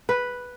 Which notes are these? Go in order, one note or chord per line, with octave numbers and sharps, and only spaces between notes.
B4